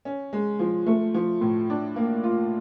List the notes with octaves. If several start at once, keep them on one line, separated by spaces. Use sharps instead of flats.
C#4
G#3
F3
A3
F3
A2
D4
A#3
F4